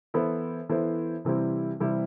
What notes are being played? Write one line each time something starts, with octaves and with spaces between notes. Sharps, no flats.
E3 B3 E4 A4 C5
E3 B3 E4 A4 C5
C3 E3 G3 C4 E4
C3 E3 G3 C4 E4